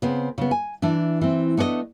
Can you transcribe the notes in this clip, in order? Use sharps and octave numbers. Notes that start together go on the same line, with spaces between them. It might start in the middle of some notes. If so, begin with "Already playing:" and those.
C#3 B3 C4
C#3 B3
G#5
E3 D4
E3 C4
A3 B3 D4 C#5 D#5